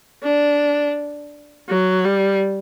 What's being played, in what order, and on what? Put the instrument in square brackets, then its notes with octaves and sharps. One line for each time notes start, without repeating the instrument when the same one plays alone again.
[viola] D4
F#3
G3